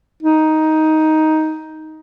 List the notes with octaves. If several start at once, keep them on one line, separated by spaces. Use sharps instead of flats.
D#4